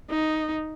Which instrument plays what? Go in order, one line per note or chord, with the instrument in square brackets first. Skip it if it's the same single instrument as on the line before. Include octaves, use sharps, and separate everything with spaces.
[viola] D#4